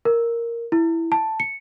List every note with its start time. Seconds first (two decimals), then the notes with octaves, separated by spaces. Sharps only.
0.05 A#4
0.72 E4
1.12 A5
1.40 C#7